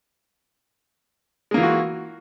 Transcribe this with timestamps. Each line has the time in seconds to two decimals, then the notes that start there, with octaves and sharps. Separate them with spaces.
1.51 G#3
1.54 A#3
1.57 E3
1.60 F4
1.63 F#4